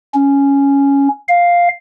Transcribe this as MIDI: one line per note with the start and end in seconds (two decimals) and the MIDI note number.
0.14 1.08 61
1.28 1.68 77